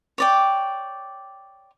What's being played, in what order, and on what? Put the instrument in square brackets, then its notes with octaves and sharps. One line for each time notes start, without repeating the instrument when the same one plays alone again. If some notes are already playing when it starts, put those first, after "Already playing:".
[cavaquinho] C#5 D5 G5